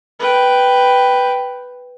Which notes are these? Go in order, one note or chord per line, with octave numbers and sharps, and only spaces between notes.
B4 G5